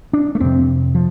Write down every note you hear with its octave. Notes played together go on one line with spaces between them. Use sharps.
D4
A3
F2 C3 C4
F3